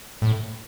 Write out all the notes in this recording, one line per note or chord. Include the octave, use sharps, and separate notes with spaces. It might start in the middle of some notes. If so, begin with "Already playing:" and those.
A2